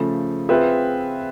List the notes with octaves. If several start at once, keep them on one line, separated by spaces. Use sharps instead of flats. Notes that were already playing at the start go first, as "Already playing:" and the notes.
Already playing: C#3 F3 A3
C4 F4 G#4 B4 E5